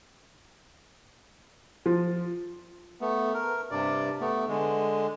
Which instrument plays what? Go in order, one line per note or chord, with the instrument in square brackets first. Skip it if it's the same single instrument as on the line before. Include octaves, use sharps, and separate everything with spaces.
[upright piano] F3
[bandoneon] A3 B3
A#4
G2 C3 D5
A3 B3
D3 G#3